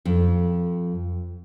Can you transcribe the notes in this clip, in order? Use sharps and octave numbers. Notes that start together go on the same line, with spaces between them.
F2